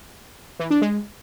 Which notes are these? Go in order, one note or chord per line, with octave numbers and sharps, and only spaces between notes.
E3
D4
G#3